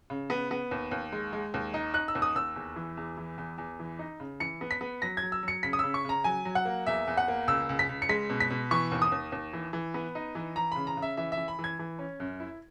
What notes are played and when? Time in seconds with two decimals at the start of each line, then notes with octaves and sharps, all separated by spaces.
0.10 C#3
0.30 B3
0.51 B3
0.71 D#2
0.91 D#2
1.12 G#3
1.33 G#3
1.54 D#2
1.74 D#4
1.94 D#4 F#6
2.08 E6
2.15 D#2
2.22 D#6
2.35 D#2 E6
2.56 E2
2.76 E3
2.97 E2
3.17 E3
3.38 E2
3.58 E2
3.80 E3
3.99 D#4
4.20 C#3
4.40 E3 C#7
4.61 B3
4.71 B6
4.81 B3
5.02 F#3 A#6
5.17 G#6
5.22 F#3
5.32 E6
5.43 F#3 C#7
5.63 C#3 B6
5.73 D#6
5.79 C#3 E6
5.94 C#6
6.05 C#3 A#5
6.24 F#3 G#5
6.45 F#3
6.55 F#5
6.65 A#3
6.87 E2 E5
7.07 E2
7.17 F#5
7.28 A#3
7.47 C#2 E6
7.69 C#2
7.79 B6
7.89 C#2
8.02 C#7
8.09 G#3 B6
8.29 B2
8.40 B6
8.50 B2
8.71 E3 C#6
8.92 D#2
9.02 D#6
9.12 D#2
9.32 D#2
9.53 E3
9.73 E3
9.94 B3
10.15 D#4
10.35 E3
10.56 E3 A#5
10.72 C#3 B5
10.87 A#5
10.97 C#3
11.02 E5
11.17 E3 E5
11.32 E5
11.37 E3
11.48 B5
11.59 E3
11.64 G#6
11.79 E3
11.99 C#4
12.20 F#2
12.40 E4